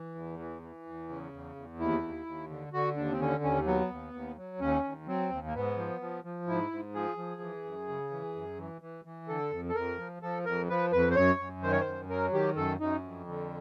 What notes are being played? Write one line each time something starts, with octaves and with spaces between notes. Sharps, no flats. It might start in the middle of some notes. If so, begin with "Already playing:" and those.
Already playing: E3
E2
E3
E3
E2
C#3
E2
E2
D#2 E4
D#2
D#2
D3
D3 F#4
D#2 D4
C4
D3 C#4
D#2 C#4
F#3 B3
D#2
D#2
F#3
D#2 C#4
D#2
F#3 C4
D#2
A#3
G#2 B3
F3
F3
F3
G#2 E4
G#2
F3 G#4
F3
E3
F#2
C#3
E3
F#2
E3
E3
E3
D3 A4
F2
A4
F2 A#4
F3
F3 A4
F2 A#4
F3 B4
F2 B4
C5
F#2 C#5
F#2
D#3 C5
C#5
C5
F#2
F#3 A#4
D#3 G4
F#2 A4
F#2 D#4
F2
D3